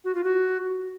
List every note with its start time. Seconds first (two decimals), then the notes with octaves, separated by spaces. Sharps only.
0.05 F#4
0.15 F4
0.24 F#4